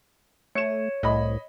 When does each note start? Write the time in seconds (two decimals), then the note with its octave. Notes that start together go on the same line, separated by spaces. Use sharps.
0.55 A3 C#5 C#7 E7
1.03 C2 A2 D#5 B5